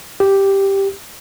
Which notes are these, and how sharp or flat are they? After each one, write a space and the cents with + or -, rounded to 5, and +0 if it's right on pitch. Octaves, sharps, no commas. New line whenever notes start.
G4 +0